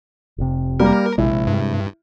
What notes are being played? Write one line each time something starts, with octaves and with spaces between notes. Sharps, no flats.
F1 C3
G3 A#3 A#4
A#1 C3 G#3 E4
G2